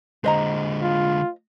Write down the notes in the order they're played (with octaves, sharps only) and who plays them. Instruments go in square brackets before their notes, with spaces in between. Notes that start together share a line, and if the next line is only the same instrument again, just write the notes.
[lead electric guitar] D3 G#3 [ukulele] C5 D#5 A#5
[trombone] F4